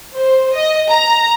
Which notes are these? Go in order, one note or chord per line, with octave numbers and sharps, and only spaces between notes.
C5
D#5
A#5